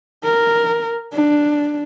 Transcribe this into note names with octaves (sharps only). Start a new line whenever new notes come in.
A#4
D4